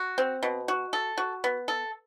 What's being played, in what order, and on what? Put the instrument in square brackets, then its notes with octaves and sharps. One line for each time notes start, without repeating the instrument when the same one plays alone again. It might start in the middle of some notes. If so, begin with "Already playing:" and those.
Already playing: [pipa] F#4
C4
B2
F#4
A4
F#4
B3
A4